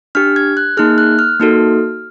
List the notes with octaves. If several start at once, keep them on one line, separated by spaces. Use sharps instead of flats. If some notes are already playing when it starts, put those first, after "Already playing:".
D4 G4 F6
G#6
F#6
A#3 D#4 G#4 F6
F#6
F6
A#3 D#4 F#4 A4